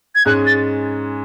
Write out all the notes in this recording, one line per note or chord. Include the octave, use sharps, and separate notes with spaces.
G#6
G#2 G#3 C#4 G#4 F#6
A6